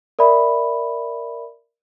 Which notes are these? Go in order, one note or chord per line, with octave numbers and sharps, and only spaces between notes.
A#4 D5 E5 B5